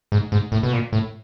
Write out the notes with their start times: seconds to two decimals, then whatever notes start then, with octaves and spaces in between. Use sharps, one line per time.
0.12 G#2
0.32 G#2
0.52 A2
0.63 B2
0.73 A#2
0.93 A2